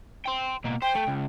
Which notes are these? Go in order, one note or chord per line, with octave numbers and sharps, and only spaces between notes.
G5 C6
B2 A#3
C5 G5
A3
C#2